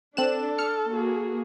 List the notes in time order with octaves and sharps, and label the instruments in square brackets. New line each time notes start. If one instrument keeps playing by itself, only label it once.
[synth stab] C4 F#6 E7 [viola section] D4 [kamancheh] A4
[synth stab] F6 C#7
[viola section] A#3 F#4 G#4